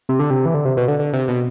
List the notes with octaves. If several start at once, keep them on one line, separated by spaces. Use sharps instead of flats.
C3
D3
C3
E3
D3
C3
B2
D3
D3
C3
B2